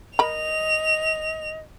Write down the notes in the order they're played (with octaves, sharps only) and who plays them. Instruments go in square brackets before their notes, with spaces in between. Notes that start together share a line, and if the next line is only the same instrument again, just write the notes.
[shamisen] A#4 B5 [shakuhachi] D#5 [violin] F7